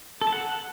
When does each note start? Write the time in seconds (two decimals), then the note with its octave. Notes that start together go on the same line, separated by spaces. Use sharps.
0.21 A4
0.27 A5
0.32 F#5